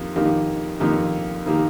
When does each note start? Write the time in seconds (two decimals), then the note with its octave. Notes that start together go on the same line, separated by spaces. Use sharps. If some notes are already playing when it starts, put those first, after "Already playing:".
Already playing: F2 D#3 A#3 G4
0.15 F2 D#3 A#3 D#4 G4
0.80 F2 D#3 A#3 D#4 G4
1.46 D#3 A#3 D#4 G4